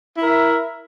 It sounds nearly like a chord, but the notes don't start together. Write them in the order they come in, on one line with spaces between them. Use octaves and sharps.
E4 A#4 E5